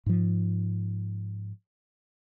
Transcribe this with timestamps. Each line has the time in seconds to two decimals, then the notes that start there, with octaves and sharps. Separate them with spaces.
0.06 G#2 F3